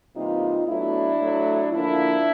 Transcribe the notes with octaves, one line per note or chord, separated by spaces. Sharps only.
C3 E3 G3 A#3 D#4 F4
B2 F#3 A3 D4 E4
A2 F#3 A3
D3 F3 A#3 D4 E4